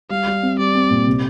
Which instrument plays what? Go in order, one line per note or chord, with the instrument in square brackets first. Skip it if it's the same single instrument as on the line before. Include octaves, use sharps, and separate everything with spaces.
[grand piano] G3 [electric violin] F5
[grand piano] G3
C4
[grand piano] G3 [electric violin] D5
[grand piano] C4
A#2
C3